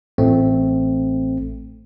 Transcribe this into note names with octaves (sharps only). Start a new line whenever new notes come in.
A1 A3 C4